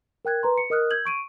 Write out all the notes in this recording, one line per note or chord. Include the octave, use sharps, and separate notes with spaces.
A#4 G5 F#6 G#6
B4 A#5 C6
C#7
A#4 D#5 D#6 F6 F#6
E6 G6 G#6 F#7
C#6 D7 D#7